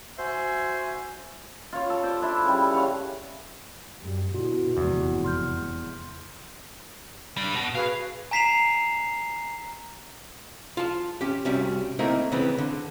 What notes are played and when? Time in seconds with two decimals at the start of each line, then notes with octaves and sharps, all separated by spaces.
0.19 F#4 C5 E5 G#5
1.72 F4 C#5
1.90 A4
2.03 C5 D5
2.21 D4 E4
2.45 C#3 G3
2.72 C#5 F5 F#5
3.99 F#2 G3
4.34 B2 D3 E4 F#4
4.77 F1 E2 G#2
5.24 C6 F6 G6
7.37 G3 D4
7.54 B2
7.75 F#4 G#4 B4 F5
8.31 G#5 A#5 B6 C7 E7 F7
10.77 F4 A5
11.21 C#4 G4
11.45 C2 G3 C#4 F#4 E5
11.99 A3 A#3 C4 D#4 E4 A#4
12.32 C#3 E3 B3 C4
12.58 D3